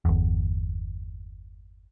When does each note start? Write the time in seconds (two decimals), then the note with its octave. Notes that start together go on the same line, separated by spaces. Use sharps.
0.05 G1 E2